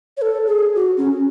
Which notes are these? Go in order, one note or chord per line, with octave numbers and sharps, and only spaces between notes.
C#5
A4
G#4
F#4
C#4